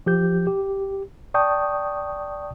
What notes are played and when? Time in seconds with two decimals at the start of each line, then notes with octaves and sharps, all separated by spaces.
0.06 F3 G4 G6
0.47 G4
1.34 D5 G5 A5 C#6 D#6 G6